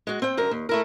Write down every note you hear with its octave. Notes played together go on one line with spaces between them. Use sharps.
G#3 F#4
C4 G5
F#2 D3 A#4
D#2
A3 E4 A#4